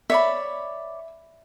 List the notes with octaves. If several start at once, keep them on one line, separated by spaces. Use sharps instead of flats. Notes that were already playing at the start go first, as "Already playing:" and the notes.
C#5 D5 E5 B5